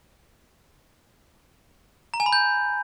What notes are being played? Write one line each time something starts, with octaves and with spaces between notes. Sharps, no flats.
A#5
G#5
B5
G6